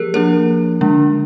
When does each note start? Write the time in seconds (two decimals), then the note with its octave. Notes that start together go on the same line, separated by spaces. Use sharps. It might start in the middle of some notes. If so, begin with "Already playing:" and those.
Already playing: F3 A#3 G4 G#4 A#4
0.14 F3 A#3 D4 A#4
0.81 D3 G#3 D4